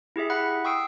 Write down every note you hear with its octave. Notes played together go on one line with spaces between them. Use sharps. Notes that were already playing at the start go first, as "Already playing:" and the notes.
E4 G4 G#4 E5
F#5 B5 F#6
G5 C#6 D#6 E6 C7 D7